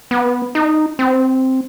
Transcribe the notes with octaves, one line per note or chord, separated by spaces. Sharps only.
B3
D#4
C4